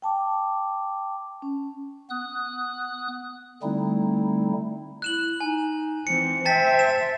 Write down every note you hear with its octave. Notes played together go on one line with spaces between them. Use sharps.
G5 A5 D6
C#4
B3 D#6 F#6
D3 G3 A3 C4 D#4 E4
E4 F#6 E7 F#7
D#4 G#5
E3 C4 C#7
C5 E5 G5 A5 A6 B6
E7